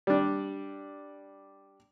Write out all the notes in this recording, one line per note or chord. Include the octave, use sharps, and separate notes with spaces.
G3 D4